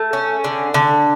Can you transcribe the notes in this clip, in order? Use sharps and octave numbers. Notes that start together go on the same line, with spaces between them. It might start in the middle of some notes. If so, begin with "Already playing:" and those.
Already playing: A3
C#4
D3
D3